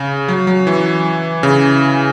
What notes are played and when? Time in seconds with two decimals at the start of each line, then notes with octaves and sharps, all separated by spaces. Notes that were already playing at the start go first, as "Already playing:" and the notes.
Already playing: C#3
0.28 F#3
0.47 F#3
0.67 E3
1.43 C#3